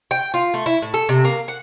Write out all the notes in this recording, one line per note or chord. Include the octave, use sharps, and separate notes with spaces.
G5
F4
A3
E4
A2
A4
C3
A#3
F#5